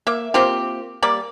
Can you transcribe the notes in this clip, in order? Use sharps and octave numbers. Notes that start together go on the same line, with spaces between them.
A#3 E5
A#3 C4 F4 G4
G3 A#3 D5